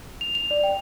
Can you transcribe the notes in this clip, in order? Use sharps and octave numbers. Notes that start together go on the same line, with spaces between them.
F7
F7
D5
G5